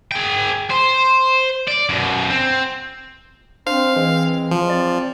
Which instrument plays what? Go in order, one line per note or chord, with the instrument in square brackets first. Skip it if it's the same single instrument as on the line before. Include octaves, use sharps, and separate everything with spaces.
[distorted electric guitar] G#4 G5
C5
D5
F#2 B2
C4
[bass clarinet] C4 [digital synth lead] D4 [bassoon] C5 [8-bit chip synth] F5
[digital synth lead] E3 [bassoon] G#3
[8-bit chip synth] F3
[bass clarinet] C4 [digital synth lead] D5